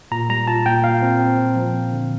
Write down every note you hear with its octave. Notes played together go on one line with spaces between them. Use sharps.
A#2 A#5
G3 A#5
F4 A5
A#2 G5
A#2 F5
C4
C4
A#2
F3
C4
D3